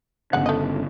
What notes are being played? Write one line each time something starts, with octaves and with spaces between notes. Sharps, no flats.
G1 C#3 G#3 F#5
A3 D#5